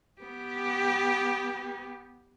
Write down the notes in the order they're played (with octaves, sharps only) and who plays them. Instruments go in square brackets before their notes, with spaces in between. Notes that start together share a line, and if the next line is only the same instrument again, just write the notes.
[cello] B3 G4